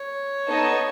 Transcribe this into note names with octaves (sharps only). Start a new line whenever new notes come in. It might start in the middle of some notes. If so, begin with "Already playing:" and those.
Already playing: C#5
B3 D#4 A4 D#5 A5